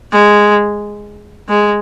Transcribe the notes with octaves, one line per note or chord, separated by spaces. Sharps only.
G#3
G#3